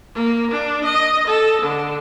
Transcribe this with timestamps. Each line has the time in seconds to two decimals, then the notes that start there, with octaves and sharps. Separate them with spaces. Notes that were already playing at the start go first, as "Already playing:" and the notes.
0.15 A#3
0.51 D4
0.84 D#5
1.27 A4
1.62 D3